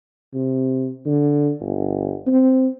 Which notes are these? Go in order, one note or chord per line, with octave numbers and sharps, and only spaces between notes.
C3
D3
G1
C4